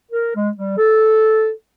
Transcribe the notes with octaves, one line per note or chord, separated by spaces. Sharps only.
A#4
G#3
G3
A4